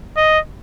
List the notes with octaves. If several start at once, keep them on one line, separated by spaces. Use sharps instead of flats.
D#5